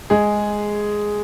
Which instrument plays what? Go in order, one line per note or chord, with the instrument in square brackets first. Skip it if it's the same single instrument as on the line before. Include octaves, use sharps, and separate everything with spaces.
[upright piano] G#3 G#4